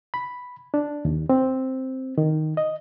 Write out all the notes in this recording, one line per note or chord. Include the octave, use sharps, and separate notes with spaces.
B5
D4
D#2
C4
D#3
D#5